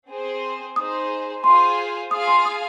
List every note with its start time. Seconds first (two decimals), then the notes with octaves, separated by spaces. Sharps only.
0.09 C4 G#4 C5
0.76 D#4 G#4 C5 D#6
1.43 F4 G#4 C5 G#5 C6
2.11 F4 G#4 F5 G#5 D#6
2.28 C6
2.45 D#6